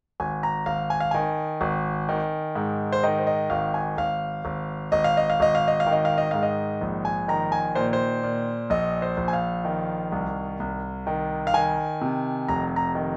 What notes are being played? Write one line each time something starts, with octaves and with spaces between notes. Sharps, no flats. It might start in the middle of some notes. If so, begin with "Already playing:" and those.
G#1 G#5
A#5
G#1 F5
G#5
F5
D#3 G#5
G#1
D#3
G#2
C5
D#3 D#5
C5
D#5
G#1 F5
G#5
G#1 F5
G#1
G#1 D#5
F5
D#5
F5
G#1 D#5
F5
D#5
F5
D#3
D#5
F5
D#5
G#2 F5
D#5
A#1
G#5
D#3 A#5
G#5
A#2 C5
C5
A#2
A#1 D#5
C5
A#1
G#5
F5
D#3
C2
C2
D#3
F5
D#3 G#5
C3
F1 A#5
A#5
D#3